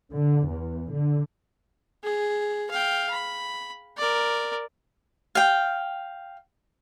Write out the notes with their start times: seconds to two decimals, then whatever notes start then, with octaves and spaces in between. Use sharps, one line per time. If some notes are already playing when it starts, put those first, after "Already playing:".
0.12 D3
0.47 E2
0.93 D3
2.04 G#4
2.71 F5 G5
3.10 B5
3.97 A#4 D5
5.35 F5 G5